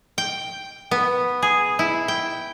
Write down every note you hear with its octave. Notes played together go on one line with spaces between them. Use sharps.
G5
B3
G#4
E4
G5